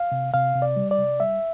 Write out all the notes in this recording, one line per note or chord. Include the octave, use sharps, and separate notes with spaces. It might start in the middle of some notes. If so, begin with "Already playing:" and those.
Already playing: F5
C3
C3 F5
C3
D5
G3
D5
C3
G3 E5